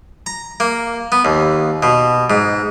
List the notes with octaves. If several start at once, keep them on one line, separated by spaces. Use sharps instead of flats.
A#5
A#3
B3
D#2
B2
G#2